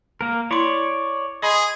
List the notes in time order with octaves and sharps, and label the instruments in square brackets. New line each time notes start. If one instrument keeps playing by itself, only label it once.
[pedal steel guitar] A#3 A#4
[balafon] E4 C6 [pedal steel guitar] C#5 D5
[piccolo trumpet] G#4 [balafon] D#5 B5 C6